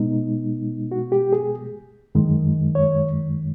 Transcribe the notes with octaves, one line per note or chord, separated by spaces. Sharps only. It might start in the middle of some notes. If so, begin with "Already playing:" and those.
Already playing: B2 G#3 B3 D#4
F#4
G4
G#4
F#2 D#3 G#3
C#5